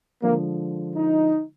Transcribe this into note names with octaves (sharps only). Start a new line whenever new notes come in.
D3 F3 G#3 A#3
D#4